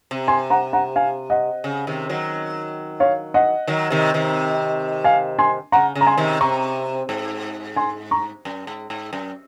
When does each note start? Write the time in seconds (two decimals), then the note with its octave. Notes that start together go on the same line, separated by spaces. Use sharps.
0.11 C3
0.28 G#5 C6
0.50 F#5 A#5
0.73 F#5 A#5
0.96 F5 G#5
1.30 D#5 F#5
1.64 C#3
1.87 C3 D#3
2.09 D#3 F#3
3.00 C#5 F5
3.34 D#5 F#5
3.68 D#3 F#3
3.90 C3 D#3
4.14 C3 D#3
5.04 F5 G#5
5.39 G#5 C6
5.72 C#3 F#5 A#5
5.95 C#3
6.01 A#5
6.07 G#5 C6
6.17 C3 D#3
6.41 C3 A#5 C#6
7.09 G#2
7.76 G#5 C6
8.11 A#5 C#6
8.45 F#2
8.67 G#2
8.90 G#2
9.13 F#2